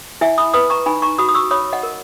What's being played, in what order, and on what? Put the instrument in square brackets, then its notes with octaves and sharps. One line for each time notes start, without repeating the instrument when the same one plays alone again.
[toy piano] E4 E5 G#5
B5 D#6
B4 B5 D#6
A#5 C#6
D#4 G#5 B5
A#5 C#6
F#4 B5 D#6
D#6
C#6 E6
C#5 B5 D#6
D#5 F#5
A#4